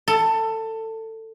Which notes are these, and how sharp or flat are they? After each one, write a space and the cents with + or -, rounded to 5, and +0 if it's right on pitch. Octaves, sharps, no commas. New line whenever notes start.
A4 +20